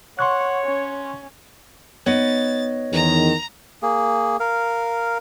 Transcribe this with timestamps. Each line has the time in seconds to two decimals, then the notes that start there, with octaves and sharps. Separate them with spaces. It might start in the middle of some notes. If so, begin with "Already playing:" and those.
0.19 C#5 F#5 C6 C#6 F#6
0.64 C#4
2.06 B3 D#4 C#5 D#5 A6
2.92 E2 D#3 A#5
3.82 A#3 G#4
4.40 A#4 F5